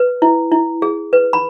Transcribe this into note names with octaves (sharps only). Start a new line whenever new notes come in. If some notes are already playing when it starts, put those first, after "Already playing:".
Already playing: B4
E4
E4
G#4
B4
B5